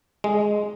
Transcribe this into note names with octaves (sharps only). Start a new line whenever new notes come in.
G#3